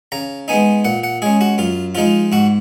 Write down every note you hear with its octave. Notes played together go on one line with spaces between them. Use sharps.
C#3 A#5
G#3 B3 D#4 G#5
A#2 F#5
F#5
G#3 C#4 G#4
F#4
F#2 F4
F3 G#3 D#4 F4
G#2 F#4